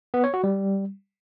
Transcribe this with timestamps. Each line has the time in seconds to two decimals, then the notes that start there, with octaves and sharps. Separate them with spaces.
0.14 B3
0.24 C#5
0.34 F#4
0.44 G3